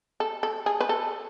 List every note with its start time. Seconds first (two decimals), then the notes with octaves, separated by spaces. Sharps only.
0.20 A4
0.43 A4
0.66 G#4
0.80 B4
0.89 A4